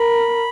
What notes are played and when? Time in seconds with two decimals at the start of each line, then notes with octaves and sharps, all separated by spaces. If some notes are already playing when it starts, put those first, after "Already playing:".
Already playing: A#4 B5